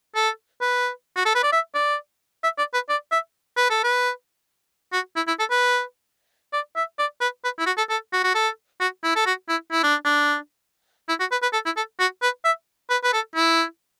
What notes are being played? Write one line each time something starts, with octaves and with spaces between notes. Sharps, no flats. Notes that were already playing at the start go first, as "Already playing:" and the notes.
A4
B4
F#4
A4
B4
D5
E5
D5
E5
D5
B4
D5
E5
B4
A4
B4
F#4
E4
E4
A4
B4
D5
E5
D5
B4
B4
E4
F#4
A4
A4
F#4
F#4
A4
F#4
E4
A4
F#4
E4
E4
D4
D4
E4
F#4
B4
B4
A4
E4
A4
F#4
B4
E5
B4
B4
A4
E4